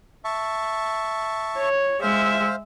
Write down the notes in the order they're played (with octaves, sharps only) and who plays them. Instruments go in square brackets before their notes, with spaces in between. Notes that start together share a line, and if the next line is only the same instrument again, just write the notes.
[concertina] E5 A5 C#6
[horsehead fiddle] C#5
[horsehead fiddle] G#3 E5 [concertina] C5 F5